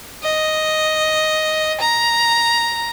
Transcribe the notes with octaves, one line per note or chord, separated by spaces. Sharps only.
D#5
A#5